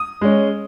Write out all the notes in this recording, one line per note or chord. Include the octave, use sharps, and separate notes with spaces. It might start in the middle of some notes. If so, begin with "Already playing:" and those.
Already playing: D#6
G#3 C#4